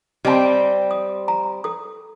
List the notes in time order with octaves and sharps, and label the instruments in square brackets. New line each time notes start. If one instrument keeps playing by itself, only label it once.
[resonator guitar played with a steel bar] G3 C4 [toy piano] D#5 A5
[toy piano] D#6
A#5
A4 D#6